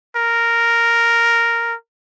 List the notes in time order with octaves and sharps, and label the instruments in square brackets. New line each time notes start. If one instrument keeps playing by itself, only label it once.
[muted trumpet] A#4